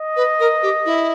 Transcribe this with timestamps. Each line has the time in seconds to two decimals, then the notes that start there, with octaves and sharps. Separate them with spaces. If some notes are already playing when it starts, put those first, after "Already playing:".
Already playing: D#5
0.16 B4
0.39 A#4
0.62 G4
0.85 E4